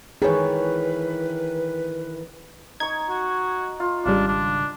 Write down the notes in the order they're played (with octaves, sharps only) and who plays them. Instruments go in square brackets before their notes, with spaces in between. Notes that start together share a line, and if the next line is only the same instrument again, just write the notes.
[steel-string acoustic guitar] D#3 E3 [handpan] G#4 C#5 [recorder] B4
[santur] D#4 C#6 [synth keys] G#6
[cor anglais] F#4
[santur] F4
[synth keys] G#1 C#3 G3 [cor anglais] D4 [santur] F5
[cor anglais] D4